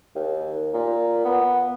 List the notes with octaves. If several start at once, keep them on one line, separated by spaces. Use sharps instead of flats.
D#2
A#2
B3